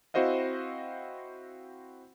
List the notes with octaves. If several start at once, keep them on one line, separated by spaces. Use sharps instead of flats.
C4 E4 F#4 C5 D#5 F5